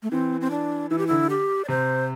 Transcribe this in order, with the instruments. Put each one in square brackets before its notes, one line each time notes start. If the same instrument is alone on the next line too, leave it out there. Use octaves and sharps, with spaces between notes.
[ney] A3
[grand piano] E3 [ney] C4
[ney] C4
D4
[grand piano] E3 [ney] E4
[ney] G4
[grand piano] D3 [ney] E4
[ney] G4
D5
[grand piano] C3 [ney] C5